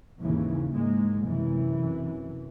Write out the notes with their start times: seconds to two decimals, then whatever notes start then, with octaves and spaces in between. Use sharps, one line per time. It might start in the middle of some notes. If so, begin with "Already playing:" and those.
0.20 D#2 G#2 C#3 E3
0.72 G#2 G#3 A#3
1.24 F#2 C3 E3